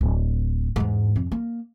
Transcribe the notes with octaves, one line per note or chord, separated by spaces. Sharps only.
D1
E2 G#2
F2
A#3